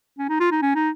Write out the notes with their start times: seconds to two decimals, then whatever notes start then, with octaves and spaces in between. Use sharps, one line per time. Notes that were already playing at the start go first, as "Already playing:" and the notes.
0.19 C#4
0.29 D#4
0.40 F4
0.51 D#4
0.62 C#4
0.75 D#4